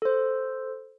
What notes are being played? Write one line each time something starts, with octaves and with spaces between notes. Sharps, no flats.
A4 C5